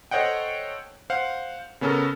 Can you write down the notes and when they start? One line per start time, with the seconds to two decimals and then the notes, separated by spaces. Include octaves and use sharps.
0.11 A4 C5 C#5 D#5 F#5 G5
1.10 C5 F5 F#5
1.81 C#3 B3 C#4 A4 A#4